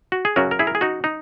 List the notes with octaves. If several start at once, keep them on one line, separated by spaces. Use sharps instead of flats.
F#4
G#4
F#2 C#3 F#3 C#4 F#4 A#4
A#4
E4 G#4
A#4
G#4
D#4 F#4
D#4